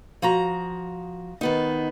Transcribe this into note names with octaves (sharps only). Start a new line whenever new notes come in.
F3 F#4 A#5
D#3 B3 D#4